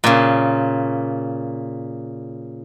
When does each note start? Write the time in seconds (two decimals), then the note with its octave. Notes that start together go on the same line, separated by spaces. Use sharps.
0.04 A#2 C#3